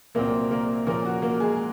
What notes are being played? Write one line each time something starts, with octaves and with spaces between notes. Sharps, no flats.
C2 A#2 F#3 A#3 C4 A#4
A#3 A#4
A#2 F3 A#3 C#4 A#4
F#4
A#3 A#4
G#3 G#4